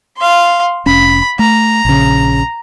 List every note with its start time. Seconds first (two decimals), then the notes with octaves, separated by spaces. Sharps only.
0.18 F5 C6
0.86 F1 C#4 B5
1.39 A3 A#5
1.85 A#1 C#3